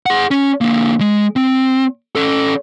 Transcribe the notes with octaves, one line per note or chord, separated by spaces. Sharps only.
G#4 F#5
C#4
D3 A#3
G#3
C4
C#4 A4